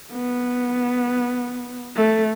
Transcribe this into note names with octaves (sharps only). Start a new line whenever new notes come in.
B3
A3